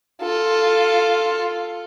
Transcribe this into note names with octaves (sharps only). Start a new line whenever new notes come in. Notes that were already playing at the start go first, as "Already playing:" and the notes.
F4 A4